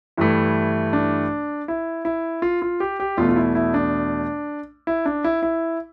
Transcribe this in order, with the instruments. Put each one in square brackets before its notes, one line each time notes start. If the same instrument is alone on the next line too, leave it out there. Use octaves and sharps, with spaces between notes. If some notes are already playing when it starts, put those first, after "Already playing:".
[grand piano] G2 E3 A3 E4
D4
E4
E4
F4
F4
G4
G4
E2 B2 A3 F4
F4
E4
E4
D4
E4
D4
E4
E4